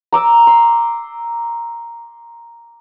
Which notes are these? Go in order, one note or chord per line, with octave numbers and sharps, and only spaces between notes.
A#5 D6 E6
C6